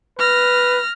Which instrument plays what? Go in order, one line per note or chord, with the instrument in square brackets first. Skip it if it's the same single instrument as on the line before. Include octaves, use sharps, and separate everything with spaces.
[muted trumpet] B4 [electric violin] F6 A#6